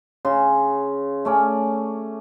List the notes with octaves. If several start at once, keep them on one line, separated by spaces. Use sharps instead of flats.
C#3 C6
A3 C#4 D5